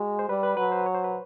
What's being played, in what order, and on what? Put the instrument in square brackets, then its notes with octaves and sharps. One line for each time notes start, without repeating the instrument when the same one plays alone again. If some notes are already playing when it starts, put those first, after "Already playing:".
Already playing: [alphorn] G#3 [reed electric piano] F#4
[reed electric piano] C5
[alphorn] G3 [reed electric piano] B4
[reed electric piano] B4
[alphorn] F#3 [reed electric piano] B4
[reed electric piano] C5
C#5
C5
B4